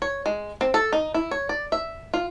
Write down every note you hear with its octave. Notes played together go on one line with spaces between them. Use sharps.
C#5
G#3
C4
A4
D#4
E4
C#5
D5
E5
F4